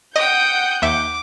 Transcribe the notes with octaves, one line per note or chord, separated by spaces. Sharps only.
D#5 F#5 G5 D#6 G6
D#2 E5 D6